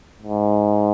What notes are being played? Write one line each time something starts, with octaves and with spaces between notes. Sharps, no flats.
G#2